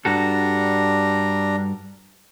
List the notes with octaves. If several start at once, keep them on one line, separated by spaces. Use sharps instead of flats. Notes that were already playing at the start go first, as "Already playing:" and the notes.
G2 G3 D4 F#4 A4 A#5